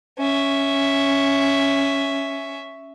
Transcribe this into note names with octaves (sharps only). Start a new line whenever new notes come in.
C#4 E5